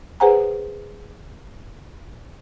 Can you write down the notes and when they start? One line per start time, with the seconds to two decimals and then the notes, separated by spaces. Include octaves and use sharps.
0.20 G#4 B4 C5 F#5 G#5 A#5